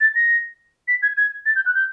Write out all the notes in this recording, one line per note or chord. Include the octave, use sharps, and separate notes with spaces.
A6
A#6
B6
G#6
G#6
A6
G6
F#6
G6